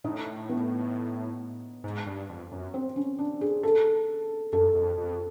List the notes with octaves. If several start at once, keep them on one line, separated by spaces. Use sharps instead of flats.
A2 D#4
B3
G#2
G2
F2
F#2
C4
C#4
D4
G#4
A4
F#2 A4
F2
F2